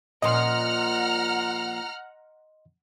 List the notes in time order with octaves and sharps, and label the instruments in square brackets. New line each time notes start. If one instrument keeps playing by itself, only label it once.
[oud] A#2 F3 C#4 [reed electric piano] D#5 C6 [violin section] F#5 A#5 F6